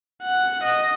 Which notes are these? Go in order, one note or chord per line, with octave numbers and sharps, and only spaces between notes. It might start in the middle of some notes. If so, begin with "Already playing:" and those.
F#5
D#5